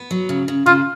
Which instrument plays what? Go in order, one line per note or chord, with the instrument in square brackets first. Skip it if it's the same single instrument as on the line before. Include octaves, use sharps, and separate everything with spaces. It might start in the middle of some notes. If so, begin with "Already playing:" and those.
Already playing: [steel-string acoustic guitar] B3
F#3
C#3
C#3
[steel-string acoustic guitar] C#3 [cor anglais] F4